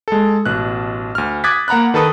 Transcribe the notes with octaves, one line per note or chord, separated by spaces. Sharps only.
G#3 A4
A1 B2 F#6
D2 F6
D6 D#6 F#6 G#6 A6 B6
A#3 F#5 A#5 B5 F#6
D#3 A4 B4 D#6